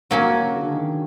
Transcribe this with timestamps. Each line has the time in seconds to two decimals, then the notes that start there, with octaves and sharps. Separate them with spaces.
0.10 C3 F#3 A#3 C#4
0.41 C#3
0.57 D3
0.71 D#3